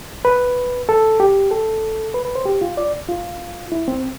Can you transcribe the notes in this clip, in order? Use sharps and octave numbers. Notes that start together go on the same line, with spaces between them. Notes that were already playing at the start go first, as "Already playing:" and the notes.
B4
A4
G4
A4
B4
B4
C5
G4
F4
D5
F4
E4
C4